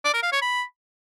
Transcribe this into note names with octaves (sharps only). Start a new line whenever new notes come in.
D5
A#4
F5
C#5
B5